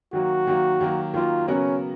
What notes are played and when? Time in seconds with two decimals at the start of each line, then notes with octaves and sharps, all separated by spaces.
0.13 D#3 F#3 A#3 F#4
0.47 D#3 F#3 A#3
0.81 D#3 F#3 A#3
1.14 D#3 F#3 A#3 F4
1.47 C#3 F#3 B3 C#4 F#4 A#4